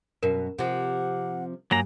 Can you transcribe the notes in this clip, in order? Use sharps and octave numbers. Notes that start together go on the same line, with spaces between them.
F#2 B2 A#4
C3 F3 F#5
G2 F#3 A#3 G#5 A#5